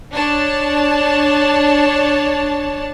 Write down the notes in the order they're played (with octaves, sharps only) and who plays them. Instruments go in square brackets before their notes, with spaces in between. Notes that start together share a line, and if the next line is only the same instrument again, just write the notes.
[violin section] D4 C#5 A5